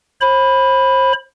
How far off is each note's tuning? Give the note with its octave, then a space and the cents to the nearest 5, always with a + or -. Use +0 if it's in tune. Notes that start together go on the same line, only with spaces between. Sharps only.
C5 +35 B5 +0